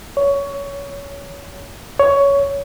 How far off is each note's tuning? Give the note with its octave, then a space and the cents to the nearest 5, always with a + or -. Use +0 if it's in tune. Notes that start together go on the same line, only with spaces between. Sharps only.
C#5 +20
C#5 +15